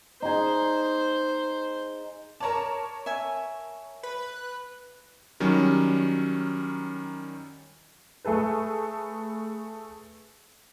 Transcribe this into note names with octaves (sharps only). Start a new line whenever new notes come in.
D#4 G#4 C5
A#4 C#5 D5 A5 A#5
E5 G#5
B4
D#3 F#3 G3 C#4
A3 G#4 A4 B4